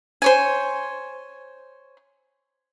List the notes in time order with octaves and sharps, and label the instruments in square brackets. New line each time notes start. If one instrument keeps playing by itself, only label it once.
[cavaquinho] C5 C#5 G#5